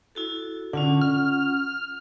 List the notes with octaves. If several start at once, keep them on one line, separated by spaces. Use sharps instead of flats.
E4 F#4 A4
D3 C#4 F4 F#5
F6